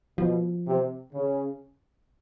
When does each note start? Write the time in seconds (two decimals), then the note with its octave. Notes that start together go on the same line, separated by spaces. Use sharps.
0.18 B2 F3
0.66 C3
1.13 C#3